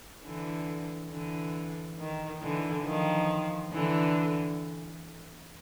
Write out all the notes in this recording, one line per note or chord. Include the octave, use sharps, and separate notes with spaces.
D3 E3
D3 E3
D#3
D3 E3
D#3 F3
D3 E3